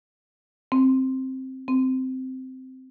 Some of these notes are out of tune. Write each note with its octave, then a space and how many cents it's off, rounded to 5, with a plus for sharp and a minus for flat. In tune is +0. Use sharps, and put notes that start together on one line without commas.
C4 +5
C4 -10